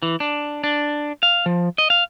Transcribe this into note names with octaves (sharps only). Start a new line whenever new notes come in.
E3
D4
D4
F5
F3
D#5
F5